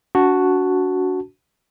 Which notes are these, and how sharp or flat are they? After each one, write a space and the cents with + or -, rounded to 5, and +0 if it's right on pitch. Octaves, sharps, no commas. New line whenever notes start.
D4 -40 F#4 +0 A5 +0